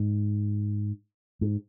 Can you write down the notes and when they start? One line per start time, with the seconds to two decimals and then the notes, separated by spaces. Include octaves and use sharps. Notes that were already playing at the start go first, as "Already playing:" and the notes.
Already playing: G#2
1.41 G#2